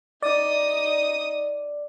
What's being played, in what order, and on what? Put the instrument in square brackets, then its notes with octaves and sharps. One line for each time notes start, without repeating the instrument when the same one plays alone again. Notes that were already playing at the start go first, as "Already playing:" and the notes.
[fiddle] D#4 D#6 [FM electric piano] D5